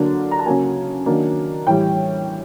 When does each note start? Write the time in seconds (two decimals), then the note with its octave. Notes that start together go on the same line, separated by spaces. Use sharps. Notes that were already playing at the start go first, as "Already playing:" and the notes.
Already playing: D3 F#3 A#3 D4
0.31 A#5
0.39 A5
0.46 C#3 F#3 A#3 G#5
1.06 D#3 F#3 A#3 D4
1.67 A2 E3 G3 G5